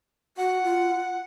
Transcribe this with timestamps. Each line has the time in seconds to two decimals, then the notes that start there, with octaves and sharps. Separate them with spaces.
0.38 F#4 F#5
0.64 F4